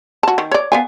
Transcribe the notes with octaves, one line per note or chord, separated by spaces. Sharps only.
F#4 A5
D#3
C#5 D5
B3 F5 G#5